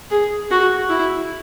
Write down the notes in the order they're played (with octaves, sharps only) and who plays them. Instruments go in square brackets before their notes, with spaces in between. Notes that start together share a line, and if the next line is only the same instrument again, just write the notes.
[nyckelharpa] G#4
F#4
E4